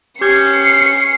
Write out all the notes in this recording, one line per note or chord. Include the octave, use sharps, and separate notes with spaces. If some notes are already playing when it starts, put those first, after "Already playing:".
C#4 G4 G6 G#6 C7 C#7